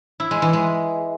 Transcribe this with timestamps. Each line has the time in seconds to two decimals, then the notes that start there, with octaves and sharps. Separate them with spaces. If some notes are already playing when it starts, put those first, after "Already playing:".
0.20 E4
0.31 G#3
0.42 E3
0.53 G#3